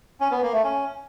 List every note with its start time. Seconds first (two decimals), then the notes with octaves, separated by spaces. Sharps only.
0.20 C#4
0.31 B3
0.42 A#3
0.53 A3
0.64 C#4